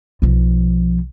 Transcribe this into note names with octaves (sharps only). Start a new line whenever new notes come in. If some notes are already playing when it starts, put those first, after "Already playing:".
B1 F3